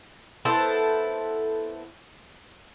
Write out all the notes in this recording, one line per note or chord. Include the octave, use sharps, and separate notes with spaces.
B3 E4 A4 C5